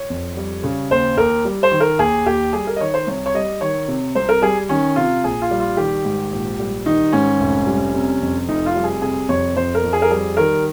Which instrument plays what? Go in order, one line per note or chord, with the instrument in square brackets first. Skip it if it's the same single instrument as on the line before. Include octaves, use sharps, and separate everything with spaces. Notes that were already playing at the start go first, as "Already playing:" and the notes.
Already playing: [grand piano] C#5
F2
G3
C#3
D#2 C5
D#2 A#4
G3
C5
D#3
A#4
D#2 G#4
D#2 G4
G3 G#4
A#4
D#5
D#3 C#5
C5
C2 C#5
C#5
G3 D#5
D#3 C#5
C3
C2 C5
A#4
G3 G#4
D#3 C#4
C3 F4
A#1 G#4
F4
G3
F4
D#3 G4
G#2
A#1
G3
D#3 D#4
G#2 C#4
F1
G3
C3
F2
F1 D#4
F4
G3
G#4
C3 G#4
F2 C#5
F2 C5
A#4
F2
G#4
A#4
G3 G#4
D#3 A#4